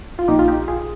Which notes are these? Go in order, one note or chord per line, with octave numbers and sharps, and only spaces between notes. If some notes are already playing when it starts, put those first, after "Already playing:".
F4
A#1 A#2 D#4 G4
F4
D#4 G4
F4 G#4